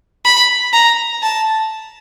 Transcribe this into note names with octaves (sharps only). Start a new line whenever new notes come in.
B5
A#5
A5